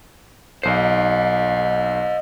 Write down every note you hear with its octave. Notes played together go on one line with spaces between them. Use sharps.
B1 C5 D#5 C7